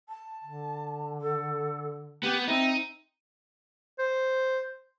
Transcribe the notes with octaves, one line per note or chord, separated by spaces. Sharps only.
A5
D3
A4
B3 G4
C4 D#4 E5
C5